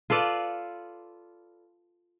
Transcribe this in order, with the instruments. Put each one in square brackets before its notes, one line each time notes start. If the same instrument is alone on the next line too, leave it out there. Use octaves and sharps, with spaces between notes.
[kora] F4 A4 B4 D5